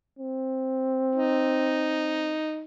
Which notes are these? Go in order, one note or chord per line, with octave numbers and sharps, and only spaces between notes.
C4
D#4